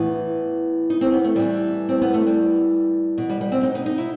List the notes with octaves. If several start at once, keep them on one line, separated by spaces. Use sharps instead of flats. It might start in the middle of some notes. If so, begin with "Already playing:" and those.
Already playing: A2 E3 B3
D#4
C4
B3
A3
A2 E3 G3
C4
B3
A3
G3
B2
G3
G3
C4
D#4
D#4
D#4
E4